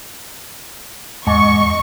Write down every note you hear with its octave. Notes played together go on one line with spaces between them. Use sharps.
E2 G#2 D#5 C#6